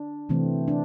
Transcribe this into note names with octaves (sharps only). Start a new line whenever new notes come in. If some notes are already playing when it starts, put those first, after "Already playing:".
Already playing: D4
C3 E3 A3 C4
D4